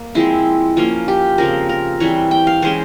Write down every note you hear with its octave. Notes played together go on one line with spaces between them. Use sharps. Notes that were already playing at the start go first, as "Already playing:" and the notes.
Already playing: A#3
F3 G#3 C4 E4
F3 A#3 C#4 F4
G4
C#3 F3 C4 A#4
A#4
E3 G3 C4 C#5
G5
F5
E3 G#3 C#4 C5